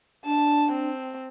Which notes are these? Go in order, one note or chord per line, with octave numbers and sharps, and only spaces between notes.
D4 A5
C4